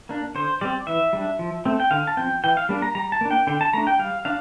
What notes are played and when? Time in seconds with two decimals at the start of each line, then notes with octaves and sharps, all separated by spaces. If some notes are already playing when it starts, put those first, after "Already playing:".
0.09 A#3 D4
0.35 D3 C5
0.61 G3 C4 D5
0.87 E3 E5
1.13 G3 D4
1.39 F3
1.65 A3 C4
1.80 G5
1.91 D3 F5
2.07 A5
2.17 F3 C4 G5
2.44 E3 G5
2.57 F5
2.69 G3 A#3 D4
2.82 A#5
2.95 G3 A#5
3.12 A5
3.21 A#3 D4
3.31 G5
3.47 D3 G5
3.61 A5
3.73 A3 D4 A#5
3.87 G5
3.99 G3 F5
4.25 D4 F5